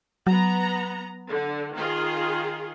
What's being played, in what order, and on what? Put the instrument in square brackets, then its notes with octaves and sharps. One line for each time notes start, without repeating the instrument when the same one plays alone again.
[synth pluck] F#3 [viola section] B3 A#5
[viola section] D3
D#3 F4 G#4